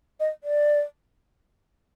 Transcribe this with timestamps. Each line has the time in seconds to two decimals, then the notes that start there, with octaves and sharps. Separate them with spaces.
0.20 D#5
0.44 D5